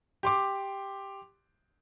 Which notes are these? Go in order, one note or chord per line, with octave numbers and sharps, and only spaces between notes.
G4 C6 D6